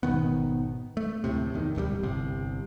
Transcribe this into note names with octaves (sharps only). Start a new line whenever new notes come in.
G#1 B2 D#3 B3
A3
D1 G#1 A2 C3
E2 D#3
D1 C2 C#3 G3
G1 C2 C3